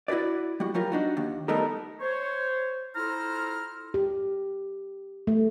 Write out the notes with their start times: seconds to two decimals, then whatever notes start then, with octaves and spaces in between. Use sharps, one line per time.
0.08 E4 F#4 G#4 B4 D5
0.60 G3 F#4
0.74 F#3 G3 F4 A#4
0.92 D4 D#4 F#4
1.17 D#2
1.48 G3 A3 B3 D#4 A4 A#4
2.01 C5 C#5
2.95 E4 F4 A4 C5 A#5 F6
3.94 G4
5.27 A3